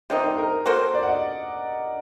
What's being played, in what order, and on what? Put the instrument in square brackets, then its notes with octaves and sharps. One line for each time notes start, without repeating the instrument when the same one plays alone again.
[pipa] C3 G3 A#3 D#4 [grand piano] C5
[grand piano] C5
A#4
[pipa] A#3 F#4 A4 C5
[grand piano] D5
F#5
D#5